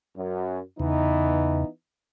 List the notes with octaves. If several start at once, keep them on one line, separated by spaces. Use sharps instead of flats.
F#2
E2 C#3 E3 B3 D#4